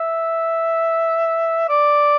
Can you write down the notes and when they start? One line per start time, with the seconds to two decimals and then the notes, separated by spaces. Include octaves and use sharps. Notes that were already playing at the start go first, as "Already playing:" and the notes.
Already playing: E5
1.69 D5